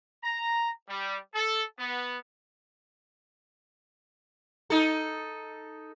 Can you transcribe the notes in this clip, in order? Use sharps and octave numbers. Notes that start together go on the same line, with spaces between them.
A#5
G3
A4
B3
D#4 A4